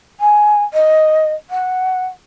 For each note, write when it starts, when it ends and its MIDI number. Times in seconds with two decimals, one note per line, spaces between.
0.20 0.63 80
0.73 1.33 75
1.50 2.06 78